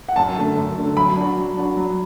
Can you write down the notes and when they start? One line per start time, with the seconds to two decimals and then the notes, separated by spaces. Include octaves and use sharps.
0.09 F#5
0.16 F#2 A5
0.37 D3 A3
0.57 F#2
0.77 D3 A3
0.97 F#3 B5
1.17 D4 F#4
1.37 F#3
1.57 D4 F#4
1.77 F#3